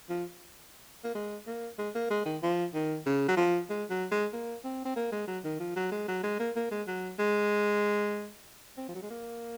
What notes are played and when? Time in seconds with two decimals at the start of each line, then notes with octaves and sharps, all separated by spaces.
0.09 F3
1.04 A#3
1.15 G#3
1.47 A#3
1.78 G#3
1.95 A#3
2.10 G#3
2.26 D#3
2.43 F3
2.74 D#3
3.06 C#3
3.28 F#3
3.37 F3
3.70 G#3
3.90 F#3
4.11 G#3
4.33 A#3
4.64 C4
4.85 C4
4.96 A#3
5.12 G#3
5.28 F#3
5.44 D#3
5.60 F3
5.76 F#3
5.92 G#3
6.08 F#3
6.23 G#3
6.40 A#3
6.56 A#3
6.71 G#3
6.87 F#3
7.19 G#3
8.77 C4
8.88 F3
8.95 F#3
9.03 G#3
9.10 A#3